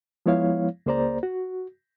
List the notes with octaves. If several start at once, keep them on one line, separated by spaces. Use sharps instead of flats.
F3 G#3 B3 E4 C#5 F5
C#2 A#3 G#4 C5 D5 A#5
F#4